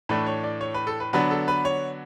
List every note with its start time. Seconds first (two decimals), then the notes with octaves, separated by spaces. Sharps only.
0.09 A2 E3 A3 D4 B4
0.26 C#5
0.44 D5
0.61 C#5
0.74 B4
0.87 A4
1.00 B4
1.13 D3 F#3 B3 D4 B4
1.31 A4
1.48 B4
1.65 C#5